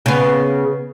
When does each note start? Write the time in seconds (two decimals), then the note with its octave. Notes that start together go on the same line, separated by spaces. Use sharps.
0.06 C#3 B3